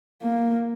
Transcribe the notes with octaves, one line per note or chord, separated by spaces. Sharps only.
A#3